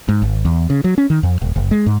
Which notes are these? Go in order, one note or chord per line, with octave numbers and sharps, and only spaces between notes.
G#2
G#1
E2
C#3
F#3
C#4
D#3
F2
D#1
F#1
G#3
G#2